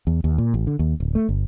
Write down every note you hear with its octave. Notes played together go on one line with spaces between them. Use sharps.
E2
D#2
A#2
A1
D3
D#2
D1
A3
G1